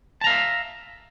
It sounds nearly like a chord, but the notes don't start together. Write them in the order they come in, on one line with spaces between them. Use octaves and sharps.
A5 A#5 F5 E5